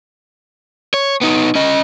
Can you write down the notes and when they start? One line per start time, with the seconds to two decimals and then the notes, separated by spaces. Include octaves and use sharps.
0.94 C#5
1.21 B3 D#4
1.55 C#4 D#5